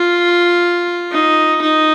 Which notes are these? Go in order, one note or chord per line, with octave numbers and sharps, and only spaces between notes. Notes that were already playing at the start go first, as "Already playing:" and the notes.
Already playing: F4
D#4
D#4